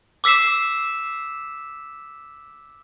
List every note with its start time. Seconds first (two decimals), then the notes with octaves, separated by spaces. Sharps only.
0.24 D6 E6 B6 C7 E7